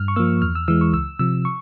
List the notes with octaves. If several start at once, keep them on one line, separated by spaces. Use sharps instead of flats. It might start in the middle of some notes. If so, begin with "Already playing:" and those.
Already playing: G2 F6
C#6
F3 A#3 E6
E2 F6
E6
E3 G#3 E6
C#6
C#2 E6
C3 F3 E6
C#6